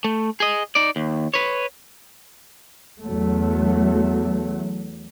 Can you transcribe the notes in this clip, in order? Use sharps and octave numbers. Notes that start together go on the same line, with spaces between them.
A3
G#4 D#5
D#4 D5
D#2
B4 C#5
E2 F#3 A3